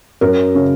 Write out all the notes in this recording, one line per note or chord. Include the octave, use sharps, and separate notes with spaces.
F#2 A#4
C#3